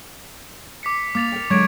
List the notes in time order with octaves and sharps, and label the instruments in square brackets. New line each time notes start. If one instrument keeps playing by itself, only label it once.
[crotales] D6 B6 C#7
[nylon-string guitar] A#3 [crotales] D6 A6 F7
[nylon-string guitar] A#4 G5
[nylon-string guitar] D3 F#3 G#3 [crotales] C#6 G#6 D7